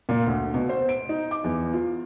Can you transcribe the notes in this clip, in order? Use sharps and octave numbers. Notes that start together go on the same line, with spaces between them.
A#2
D2
B2
C5
D7
D#4
D6
E2
F4